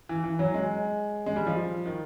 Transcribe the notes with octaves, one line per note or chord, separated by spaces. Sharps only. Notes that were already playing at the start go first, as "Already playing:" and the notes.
E3
E3
F#3
G#3
G#3
G3
F3
D#3